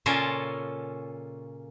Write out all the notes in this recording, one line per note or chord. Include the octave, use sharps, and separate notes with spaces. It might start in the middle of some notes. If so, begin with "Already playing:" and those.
A#2 C#3 C#4 F4 A4 A#4